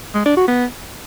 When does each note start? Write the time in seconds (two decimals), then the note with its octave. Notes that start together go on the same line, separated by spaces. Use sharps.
0.14 G#3
0.25 D4
0.37 F#4
0.48 B3